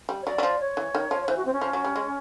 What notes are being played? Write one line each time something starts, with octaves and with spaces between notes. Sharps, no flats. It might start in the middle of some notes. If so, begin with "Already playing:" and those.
G3
C#5
F#3 D5
F#3
F3
C#5
E3
D#3
F3
C#5
E3 C5
F#4
C4
C#4
F3
F#3
G3
G#3